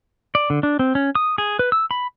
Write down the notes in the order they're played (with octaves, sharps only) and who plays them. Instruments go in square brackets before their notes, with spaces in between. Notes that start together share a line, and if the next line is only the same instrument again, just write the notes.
[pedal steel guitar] D5
D3
D4
C4
C#4
D#6
G#4
B4
E6
B5